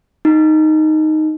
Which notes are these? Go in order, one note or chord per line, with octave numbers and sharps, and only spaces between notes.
D#4